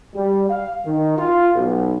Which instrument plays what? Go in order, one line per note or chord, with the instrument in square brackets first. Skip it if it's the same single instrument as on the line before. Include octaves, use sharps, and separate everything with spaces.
[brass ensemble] G3
F5
D#3
F4
B1